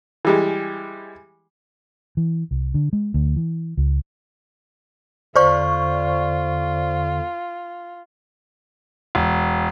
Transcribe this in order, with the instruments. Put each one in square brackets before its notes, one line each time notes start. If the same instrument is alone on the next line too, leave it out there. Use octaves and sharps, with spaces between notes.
[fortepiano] E3 G3 G#3
[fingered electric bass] E3
C2
D3
G#3
D2
E3
C#2
[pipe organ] E2 D3 [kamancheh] F4 [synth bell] C5 D5 C#6
[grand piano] E1